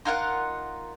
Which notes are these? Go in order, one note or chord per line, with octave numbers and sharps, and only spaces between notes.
D#4 F4 A#4 F#5